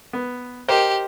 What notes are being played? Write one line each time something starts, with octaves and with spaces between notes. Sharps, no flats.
B3
G4 A#4 C5 D#5